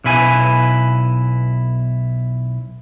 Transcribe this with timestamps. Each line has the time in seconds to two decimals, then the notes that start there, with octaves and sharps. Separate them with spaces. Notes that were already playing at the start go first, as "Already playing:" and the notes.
0.04 B1 B2 E4 B4 G#5